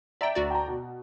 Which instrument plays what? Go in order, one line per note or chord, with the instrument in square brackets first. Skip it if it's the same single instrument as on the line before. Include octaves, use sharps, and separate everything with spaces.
[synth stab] D5 G5 [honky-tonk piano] E5 A#5
[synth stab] D2 F#4 D5
[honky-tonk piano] G5 A#5
B2